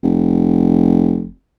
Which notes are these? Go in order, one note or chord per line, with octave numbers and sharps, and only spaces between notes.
F1